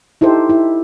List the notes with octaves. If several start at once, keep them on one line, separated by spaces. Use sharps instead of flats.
D#4 E4 G4 A4 C5
E4